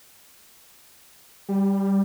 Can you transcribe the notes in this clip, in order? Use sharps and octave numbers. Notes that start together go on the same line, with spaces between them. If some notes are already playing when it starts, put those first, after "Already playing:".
G3